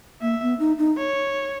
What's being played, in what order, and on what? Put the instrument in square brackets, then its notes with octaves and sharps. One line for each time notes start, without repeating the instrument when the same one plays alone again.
[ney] A#3 [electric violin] E5
[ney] B3
D#4
D#4
[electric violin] C#5